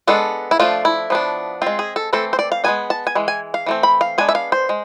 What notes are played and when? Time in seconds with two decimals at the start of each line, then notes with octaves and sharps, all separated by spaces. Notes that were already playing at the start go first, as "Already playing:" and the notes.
0.07 G#3 B3 D4 A4
0.51 E4
0.60 F3 A3 D4 F4
0.85 E4
1.10 F3 B3 D4
1.62 G#3 C4 F4
1.79 G#4
1.96 A4
2.13 E3 A3 C4 A4
2.33 C5
2.39 D5
2.52 F5
2.64 G#3 B3 D4 G#5
2.90 A5
3.07 G#5
3.15 E3 G#3
3.28 G#5
3.54 F5
3.66 E3 A3 C4
3.83 B5
4.01 F5
4.18 G#3 B3 D4 G#5
4.29 E5
4.35 F5
4.52 C5
4.69 G#3